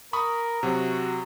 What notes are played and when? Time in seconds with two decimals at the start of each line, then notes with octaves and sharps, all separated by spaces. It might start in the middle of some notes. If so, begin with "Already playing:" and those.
0.13 A#4 B5 C#6 D#6
0.63 C3 F#3 F#4